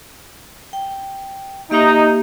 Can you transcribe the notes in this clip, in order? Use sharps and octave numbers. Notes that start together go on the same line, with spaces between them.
G5
A#3 D#4 G4 E5